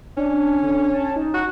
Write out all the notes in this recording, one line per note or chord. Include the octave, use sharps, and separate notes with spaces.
C#4 D4
D3
A5
D#4
F#4